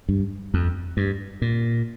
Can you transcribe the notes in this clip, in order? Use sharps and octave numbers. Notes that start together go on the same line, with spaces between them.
G2
F2
G2
A#2